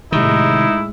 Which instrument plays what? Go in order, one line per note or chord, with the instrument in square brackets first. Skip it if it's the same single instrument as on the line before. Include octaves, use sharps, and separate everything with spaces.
[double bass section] A2 G#3 [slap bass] C3 D#3 [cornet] D#4 [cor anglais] E4